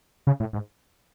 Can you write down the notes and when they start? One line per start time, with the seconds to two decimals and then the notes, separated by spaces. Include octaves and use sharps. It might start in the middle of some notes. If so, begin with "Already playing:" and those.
0.27 C#3
0.40 A2
0.53 G#2